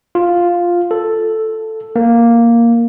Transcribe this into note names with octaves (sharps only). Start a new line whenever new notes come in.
F4
A4
A#3